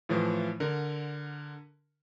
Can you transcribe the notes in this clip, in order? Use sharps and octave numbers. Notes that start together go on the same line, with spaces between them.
A2 E3 F3 A3
D3 A#4